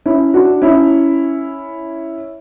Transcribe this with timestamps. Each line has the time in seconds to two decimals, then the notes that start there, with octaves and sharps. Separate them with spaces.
0.06 C#4 E4
0.34 D4 F#4
0.62 C#4 E4